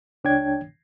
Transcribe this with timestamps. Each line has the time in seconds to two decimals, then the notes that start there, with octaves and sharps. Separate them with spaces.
0.24 C#2 D4 C#5 G5 G#6